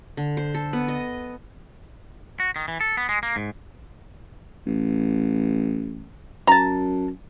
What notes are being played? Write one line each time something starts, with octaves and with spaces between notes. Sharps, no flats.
D3
C5
A4
B3
D#5
F#4
D#3
E3
A4
B3
G#3
A#3
G#2
A1
F#2 A5 A#5